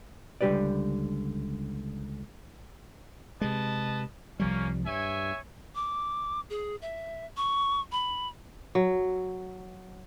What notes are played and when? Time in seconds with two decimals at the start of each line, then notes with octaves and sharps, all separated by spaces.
0.41 C#2 D3 G3 G4 B4 D5
3.41 C3 G#3 B4 D#5 A5
4.40 C2 F3 G3 A#3 C#4
4.86 G2 C#5 E5 G#5
5.75 D6
6.50 G#4
6.82 E5
7.37 C#6
7.92 B5
8.75 F#3